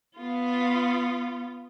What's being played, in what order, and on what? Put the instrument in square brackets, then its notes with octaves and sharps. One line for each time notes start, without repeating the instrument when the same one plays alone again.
[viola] B3 F4